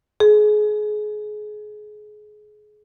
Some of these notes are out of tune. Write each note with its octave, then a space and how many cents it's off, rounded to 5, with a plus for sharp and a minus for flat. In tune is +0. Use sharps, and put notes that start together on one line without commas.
G#4 +25